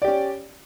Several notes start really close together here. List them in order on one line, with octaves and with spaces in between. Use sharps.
D5 G4 C#4